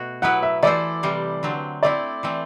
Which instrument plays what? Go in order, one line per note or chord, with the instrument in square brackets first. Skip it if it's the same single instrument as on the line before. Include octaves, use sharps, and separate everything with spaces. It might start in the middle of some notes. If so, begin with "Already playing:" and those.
Already playing: [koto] B2 A3 F#4
[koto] F#3 B3 E4 B4 [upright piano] F#5
[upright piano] E5
[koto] E3 A3 E4 A4 C5 [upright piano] D5
[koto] C3 E3 G3
D3 F#3 C4
[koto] A3 C4 E4 [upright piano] D5
[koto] E3 A3 C4